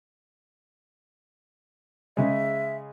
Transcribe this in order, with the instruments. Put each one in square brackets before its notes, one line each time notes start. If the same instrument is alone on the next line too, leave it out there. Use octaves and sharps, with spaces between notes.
[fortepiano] C#3 G#3 [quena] E5